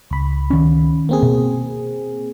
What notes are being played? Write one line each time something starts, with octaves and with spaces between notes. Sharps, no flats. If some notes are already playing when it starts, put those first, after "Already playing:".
C#2 B5
D#3 C#4
A#3 C4 G#4
B2